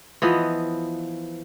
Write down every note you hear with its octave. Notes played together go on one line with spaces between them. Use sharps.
E3 F3 B3 D#5